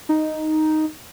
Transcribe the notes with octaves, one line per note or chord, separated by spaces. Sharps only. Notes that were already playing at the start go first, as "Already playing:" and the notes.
D#4